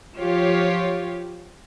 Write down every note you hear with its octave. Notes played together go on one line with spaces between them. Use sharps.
F3 F4 G4 C#5